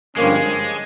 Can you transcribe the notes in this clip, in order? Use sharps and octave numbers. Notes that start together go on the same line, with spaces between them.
G2 D3 F3 G#3 A#3 C#4